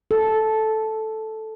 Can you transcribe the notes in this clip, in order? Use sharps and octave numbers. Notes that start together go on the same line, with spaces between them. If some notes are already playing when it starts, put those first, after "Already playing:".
A4